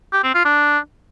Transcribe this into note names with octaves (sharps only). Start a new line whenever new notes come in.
G4
C4
F4
D4